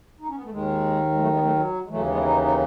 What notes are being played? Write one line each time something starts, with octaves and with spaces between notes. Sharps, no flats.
D#4
C#4
B3
A3
D#2 D#3 G#3
G#3
F#3 A3
G#3 B3
F#3 A3
F#3
G#3
D#2 C#3 E3 F#3 A3
G#3 B3
E4
B3 D#4
B3 D#4